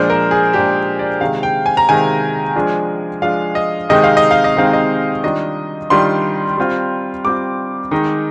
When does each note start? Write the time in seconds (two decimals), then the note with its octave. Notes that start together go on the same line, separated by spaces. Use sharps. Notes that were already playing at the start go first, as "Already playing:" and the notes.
Already playing: A#2 F3 G#3 D4 C5
0.10 A#4
0.31 G#4
0.53 A#2 F3 G#3 D4 G4
0.99 D5
1.21 C3 D#3 G#3 F5
1.43 G5
1.66 G#5
1.77 A#5
1.89 C3 D#3 G#3 G#5
2.55 F3 G#3 D4 F4
3.22 F3 G#3 D4 F4 F5
3.55 D#5
3.89 C3 D#3 G#3 C4 D#4 D#5
4.04 F5
4.17 D#5
4.31 F5
4.44 D#5
4.56 C3 D#3 G#3 C4 D#4 F5
4.73 D#5
5.23 D#3 G3 D4 F4 D#5
5.90 D#3 G3 D4 F4 C6
6.57 G3 C4 F4
7.25 G3 C4 F4 D6
7.91 D#3 G#3 D#4